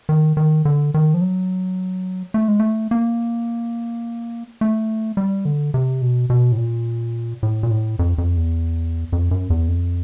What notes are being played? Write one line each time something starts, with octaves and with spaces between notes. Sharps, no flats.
D#3
D#3
D3
D#3
F3
F#3
A3
G#3
A3
A#3
A3
G3
D3
C3
B2
B2
A2
A#2
A2
A#2
A2
F2
F2
E2
F2
F#2
E2
F2